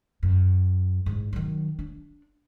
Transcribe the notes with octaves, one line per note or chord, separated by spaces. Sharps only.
F#2
A1 G#2
D#3 F#3
D4